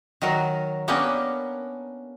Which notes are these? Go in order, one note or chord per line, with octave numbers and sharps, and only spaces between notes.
D#3 F#3 F#4 A#4
A#3 B3 C#4 D4 G4 A#4